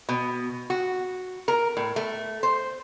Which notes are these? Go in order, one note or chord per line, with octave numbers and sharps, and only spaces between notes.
B2
F#4
A#4
A2
A3
C5